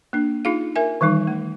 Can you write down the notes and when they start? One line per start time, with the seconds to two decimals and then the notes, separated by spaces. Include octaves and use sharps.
0.13 A#3 D4
0.45 D#4 F4 G#4 F5
0.76 A#4 E5 G#5
1.01 D#3 E3 G3 D#4
1.27 A3